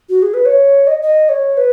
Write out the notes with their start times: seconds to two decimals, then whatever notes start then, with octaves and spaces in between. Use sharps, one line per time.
0.09 F#4
0.22 G#4
0.34 B4
0.45 C#5
0.87 D#5
1.02 D#5
1.29 C#5
1.57 B4